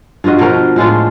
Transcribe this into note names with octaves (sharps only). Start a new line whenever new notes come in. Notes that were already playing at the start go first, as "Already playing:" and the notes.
G2 F4 F#4 D#5
B2 F3 A#4 B4
A2 G#3 D4 F4